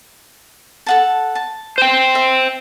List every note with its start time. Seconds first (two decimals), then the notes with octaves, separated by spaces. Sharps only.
0.86 A4 F#5 A5
1.35 A5
1.78 C5 G5
2.15 E5